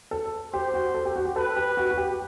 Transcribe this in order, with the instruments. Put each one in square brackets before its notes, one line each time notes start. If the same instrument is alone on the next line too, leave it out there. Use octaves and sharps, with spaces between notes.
[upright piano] A4
[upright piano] G4 [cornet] C5
[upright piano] F#4
A4
G4
F#4
G4
[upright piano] A4 [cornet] B4
[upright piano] G4
F#4
F#4
G4